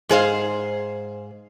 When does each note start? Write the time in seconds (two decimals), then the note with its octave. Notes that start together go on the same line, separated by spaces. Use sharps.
0.09 G#2 G#4 C5 F5